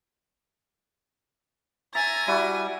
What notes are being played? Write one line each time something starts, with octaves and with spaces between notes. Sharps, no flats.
E5 G#5 A#5 A6 A#6
G3 E4 F#4 D#7